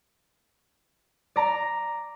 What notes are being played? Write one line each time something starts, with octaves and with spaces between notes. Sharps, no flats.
D5 A#5